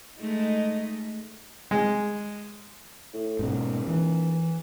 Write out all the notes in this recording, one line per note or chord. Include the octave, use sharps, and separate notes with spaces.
G#3 A3 D#4
G#3
A2
D#1 G#2 B2
E3